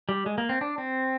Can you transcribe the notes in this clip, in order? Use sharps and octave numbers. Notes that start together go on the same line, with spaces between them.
G3
G#3
A#3
C4
D4
C4